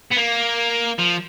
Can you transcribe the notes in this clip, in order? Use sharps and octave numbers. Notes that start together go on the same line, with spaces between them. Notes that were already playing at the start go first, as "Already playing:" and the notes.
B3
A#3
F3